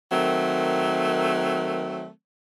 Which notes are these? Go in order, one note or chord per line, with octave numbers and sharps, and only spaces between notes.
D#3 F#3 A3 C4 A#4